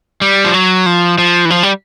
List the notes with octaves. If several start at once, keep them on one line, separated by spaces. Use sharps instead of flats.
G3
F3
F#3
F3
F3
E3
F3
G3